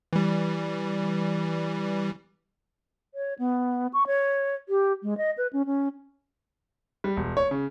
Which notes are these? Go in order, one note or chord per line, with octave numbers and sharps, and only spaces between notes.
E3 G3
C#5
B3
C#6
C#5
G4
G#3
D#5
B4
C#4
C#4
G3
E1
C#5
C#3